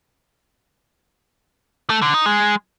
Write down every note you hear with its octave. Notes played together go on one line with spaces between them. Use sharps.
A3
D3
D#4
G#3